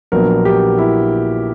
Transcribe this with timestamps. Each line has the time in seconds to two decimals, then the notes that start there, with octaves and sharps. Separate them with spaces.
0.12 A#1 A#2 F#3 B3 D4 A#4
0.45 G4
0.78 E4